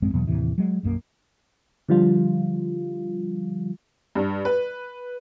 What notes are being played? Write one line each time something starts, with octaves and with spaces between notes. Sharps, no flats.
A1 F#2 G#3 C4
E2 B2 F#3 B3
D#2 A2 C3 E3
F#3 G#3
B1 F#2 D#3 A#3
D3 F3 G3 F4
G2
B4